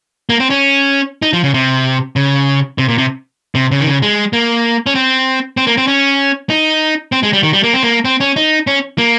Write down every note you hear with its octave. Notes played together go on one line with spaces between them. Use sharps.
A#3
C4
C#4
D#4
F3
C#3
C3
C#3
C3
A#2
C3
C3
C#3
D#3
C#3
G#3
A#3
C#4
C4
C4
A#3
C4
C#4
D#4
C4
G#3
G3
D#3
G3
A#3
C4
A#3
C4
C#4
D#4
C#4
A#3